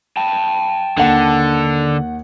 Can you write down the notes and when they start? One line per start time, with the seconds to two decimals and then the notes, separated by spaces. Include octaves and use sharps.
0.17 G5 A5
0.98 D#2 D3 F#5